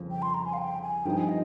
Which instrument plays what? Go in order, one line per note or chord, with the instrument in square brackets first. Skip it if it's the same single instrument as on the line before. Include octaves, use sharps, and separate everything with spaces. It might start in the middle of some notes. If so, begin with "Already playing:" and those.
Already playing: [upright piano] G1 F2 C#3 F3
[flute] G5
C6
A#5
G#5
F5
G5
G#5
[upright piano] G2 F3 C4 D#4 [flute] G5
[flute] G#5
D#5